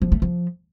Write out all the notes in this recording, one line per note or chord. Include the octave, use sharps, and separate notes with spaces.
F3
A3
F3